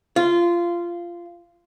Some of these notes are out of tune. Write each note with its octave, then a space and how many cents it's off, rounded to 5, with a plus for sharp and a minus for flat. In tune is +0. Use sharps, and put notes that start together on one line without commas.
F4 -15